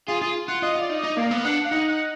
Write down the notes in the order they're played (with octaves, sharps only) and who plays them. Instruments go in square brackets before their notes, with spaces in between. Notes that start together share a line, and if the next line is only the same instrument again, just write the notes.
[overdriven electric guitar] F4 [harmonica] G#4
[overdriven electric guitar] F4 [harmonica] G#4
[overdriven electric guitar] F4 [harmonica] F#5
[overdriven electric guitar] F4 [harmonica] D#5
[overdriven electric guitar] F4
[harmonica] D5
[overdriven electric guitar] D#4
[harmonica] D#5
[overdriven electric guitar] D#4
[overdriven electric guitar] A#3 [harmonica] D5 F5
[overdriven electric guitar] B3
[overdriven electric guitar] D4 [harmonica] F#5
[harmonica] F5
[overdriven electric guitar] D#4 [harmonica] F#5
[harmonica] F#5